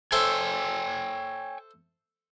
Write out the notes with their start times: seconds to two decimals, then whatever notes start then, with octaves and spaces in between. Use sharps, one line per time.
0.12 A4 C5 C#5 E5 G5 G#5